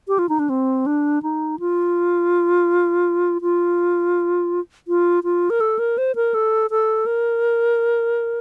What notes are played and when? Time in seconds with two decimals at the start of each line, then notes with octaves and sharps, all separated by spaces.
0.08 G4
0.19 F4
0.29 D#4
0.39 D4
0.49 C4
0.86 D4
1.23 D#4
1.60 F4
3.42 F4
4.88 F4
5.24 F4
5.50 A#4
5.60 A4
5.79 A#4
5.98 C5
6.15 A#4
6.34 A4
6.71 A4
7.06 A#4